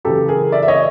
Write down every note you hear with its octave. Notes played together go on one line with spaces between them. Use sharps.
F#2 C#3 E3 G4 A4
G#4 A#4
D5 E5
E5
C#5 D#5